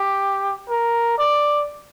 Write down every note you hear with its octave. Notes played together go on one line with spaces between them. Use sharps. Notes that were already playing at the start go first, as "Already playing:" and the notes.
Already playing: G4
A#4
D5